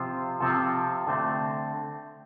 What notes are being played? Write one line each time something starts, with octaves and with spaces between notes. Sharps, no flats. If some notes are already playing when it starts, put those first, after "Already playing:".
Already playing: C3 F3 C4 F4
C3 F3 C4 F4 A4
D3 A3 C4